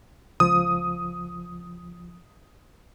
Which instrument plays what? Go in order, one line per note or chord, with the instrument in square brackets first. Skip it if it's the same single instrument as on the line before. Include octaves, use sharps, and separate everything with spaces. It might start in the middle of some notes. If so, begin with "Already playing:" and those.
[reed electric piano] C#2 F3 [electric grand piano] D#6